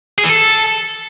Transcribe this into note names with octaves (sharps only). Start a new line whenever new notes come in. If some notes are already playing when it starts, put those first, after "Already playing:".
G#4
E3
A4